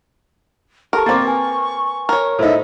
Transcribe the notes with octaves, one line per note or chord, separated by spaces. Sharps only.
G4 A4 A#4 A5 C#6
A#3 C4 D6 A6
B4 G#5
A#4 C#5
A2 D#4 C5 D#5 E5